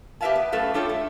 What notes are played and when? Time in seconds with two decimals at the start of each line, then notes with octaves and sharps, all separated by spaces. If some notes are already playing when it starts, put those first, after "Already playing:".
0.21 G4 B4 D5 E5 F5 A5
0.35 B3
0.52 F#2 A3 A4 B4 F5
0.74 D4 F4 A4 C#5 G5
0.89 A3